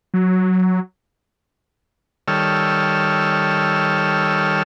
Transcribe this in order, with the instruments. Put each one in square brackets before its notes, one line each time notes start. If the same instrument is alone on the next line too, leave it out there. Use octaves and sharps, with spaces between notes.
[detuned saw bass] F#3
[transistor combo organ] D#3 G3 A4 C#5 E6 F6